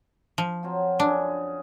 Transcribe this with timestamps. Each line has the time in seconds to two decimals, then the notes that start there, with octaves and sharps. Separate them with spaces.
0.38 F3
0.63 F#3 C4 F4
1.00 F#2 C#3 D4 G#4